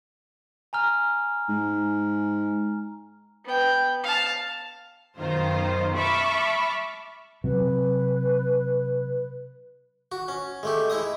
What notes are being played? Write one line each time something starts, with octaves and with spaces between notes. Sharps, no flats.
G#5 A#5 F6
G#2
B3 G5
F5 A5
F#2 B2 D#3 F4 C5
E5 A5 B5 C#6 D6 F6
C3 F#3 B4
F#4
C#4
G#3 A3 G4
G#3 E4 D#5 D#6